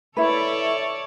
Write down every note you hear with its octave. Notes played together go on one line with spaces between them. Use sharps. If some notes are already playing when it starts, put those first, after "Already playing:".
E4 A4 B4 C#5 D5 E5